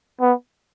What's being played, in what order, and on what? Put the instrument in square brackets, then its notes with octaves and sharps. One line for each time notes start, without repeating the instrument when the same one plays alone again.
[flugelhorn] B3